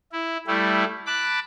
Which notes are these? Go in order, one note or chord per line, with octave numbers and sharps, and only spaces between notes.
E4
G3 A3 E4
A5 B5 D6 F#6